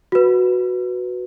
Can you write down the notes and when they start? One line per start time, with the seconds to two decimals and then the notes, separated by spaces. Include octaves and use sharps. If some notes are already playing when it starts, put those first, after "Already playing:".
0.12 F#4 B4